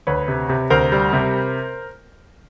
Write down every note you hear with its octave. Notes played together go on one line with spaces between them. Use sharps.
D2 B4 C#5
C3
C3
D2 A#4 C5
G3
C3